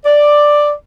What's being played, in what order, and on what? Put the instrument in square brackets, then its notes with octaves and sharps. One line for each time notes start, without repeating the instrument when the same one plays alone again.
[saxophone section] D5